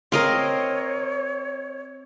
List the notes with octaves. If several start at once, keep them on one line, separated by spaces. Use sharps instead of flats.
C4 A#4 C#5 D#5 F5 C6